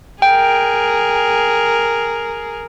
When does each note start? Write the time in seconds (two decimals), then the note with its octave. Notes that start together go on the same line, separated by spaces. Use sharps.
0.22 G#4 A#4 G5